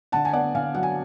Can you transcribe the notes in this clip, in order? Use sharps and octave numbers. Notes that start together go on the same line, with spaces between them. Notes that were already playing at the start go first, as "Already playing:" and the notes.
D3 F#5 A5
G#5
B3 D5 F#5
D3 F5 G#5
F#3 F#5
G#5